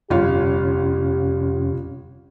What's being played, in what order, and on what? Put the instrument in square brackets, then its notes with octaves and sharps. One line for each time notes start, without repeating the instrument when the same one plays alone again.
[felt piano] G1 F4 C#5 [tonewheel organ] F2 C3 C#4 [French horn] G4